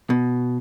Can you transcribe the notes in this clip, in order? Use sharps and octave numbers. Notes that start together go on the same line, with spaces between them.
B2